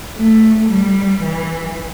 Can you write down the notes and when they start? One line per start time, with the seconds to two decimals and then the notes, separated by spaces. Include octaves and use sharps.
0.17 A3
0.70 G3
1.23 E3